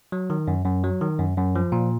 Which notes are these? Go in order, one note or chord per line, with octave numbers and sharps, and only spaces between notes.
F#3
D#3
F#2
F#2
F#3
D#3
F#2
F#2
F3
A#2